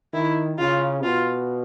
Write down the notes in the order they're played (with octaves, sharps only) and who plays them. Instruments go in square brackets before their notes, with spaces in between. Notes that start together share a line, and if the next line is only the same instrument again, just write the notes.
[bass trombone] D#3 [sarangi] E4
[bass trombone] C#3 [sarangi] F4
[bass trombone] B2 [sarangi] F4